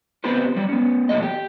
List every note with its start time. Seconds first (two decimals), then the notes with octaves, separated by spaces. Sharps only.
0.24 B3 C4 F4 G4 B4 C5
0.56 F#3 G3 F#4
0.69 B3 C#4
1.09 E2 A#2 F#3 G#3 A3 D#5
1.22 G4